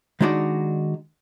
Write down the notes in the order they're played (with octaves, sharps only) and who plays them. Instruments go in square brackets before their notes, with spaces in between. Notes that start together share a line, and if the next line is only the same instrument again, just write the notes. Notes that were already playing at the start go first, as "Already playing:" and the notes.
[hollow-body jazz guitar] D#3 G#3 D4 D#4 F#4 D5